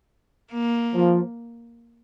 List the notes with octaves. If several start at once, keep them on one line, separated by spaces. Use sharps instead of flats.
A#3
F3